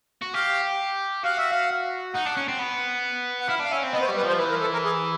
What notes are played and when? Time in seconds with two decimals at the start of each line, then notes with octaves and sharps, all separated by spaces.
0.22 F#4
0.34 G4 F5
1.24 F#4 F5
1.38 E5
1.51 F5
2.14 D#4 F#5
2.25 D4
2.37 C#4
2.48 C4
2.59 B3
3.40 F#5
3.48 E4 F5
3.59 D4 F5
3.71 C#4 E5
3.83 C4
3.93 B3 D#5
4.01 C5
4.05 C#5
4.09 G3
4.17 B4
4.24 F3 C5
4.39 E3 B4
4.50 A#4
4.61 A4
4.73 A#4
4.84 G#4